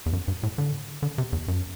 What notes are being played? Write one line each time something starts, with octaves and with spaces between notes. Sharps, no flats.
E2
F#2
G2
A2
D3
D3
C3
E2
F#2